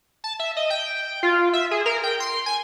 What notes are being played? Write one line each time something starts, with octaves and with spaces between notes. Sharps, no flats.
A5
E5
D#5
G5
F4
E5
G#4
A#4
G5
C6
G#5